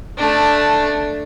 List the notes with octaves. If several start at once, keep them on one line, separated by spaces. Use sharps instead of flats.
A3 D4